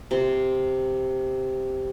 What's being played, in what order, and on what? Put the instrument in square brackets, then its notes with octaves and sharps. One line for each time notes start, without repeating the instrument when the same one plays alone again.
[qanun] C3 C6